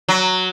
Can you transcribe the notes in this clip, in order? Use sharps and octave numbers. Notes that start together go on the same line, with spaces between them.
F#3